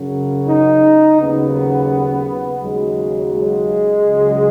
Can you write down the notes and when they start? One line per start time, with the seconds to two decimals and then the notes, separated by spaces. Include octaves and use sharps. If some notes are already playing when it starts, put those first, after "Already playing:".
Already playing: F#2 C#3 F#3
0.47 D#4
1.19 D#2 C#3 F#3 B3
2.62 D#2 C#3 F#3 G#3
3.33 G#3
4.06 C#2 C#3 F#3